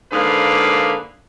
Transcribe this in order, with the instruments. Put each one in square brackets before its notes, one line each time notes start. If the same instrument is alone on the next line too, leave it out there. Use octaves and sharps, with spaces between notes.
[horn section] G#2 D3 A#3 G#4 B4 F5